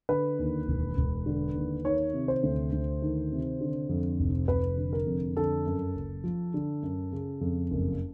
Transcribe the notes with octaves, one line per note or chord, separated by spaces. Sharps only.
D3 B4
D#2
E1
E1
D3
D#2
D#3 C#5
C3
C5
D2
D2
D#3
C3
D3
F2
F1
F1 B4
D3
A#4
F2
D3 A4
F#2
F#1
F3
D3
F#2
C#3
F2
F#1